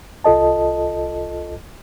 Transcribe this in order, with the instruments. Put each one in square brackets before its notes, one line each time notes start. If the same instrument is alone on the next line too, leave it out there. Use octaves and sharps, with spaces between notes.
[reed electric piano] C2 F4 A4 D#5 A5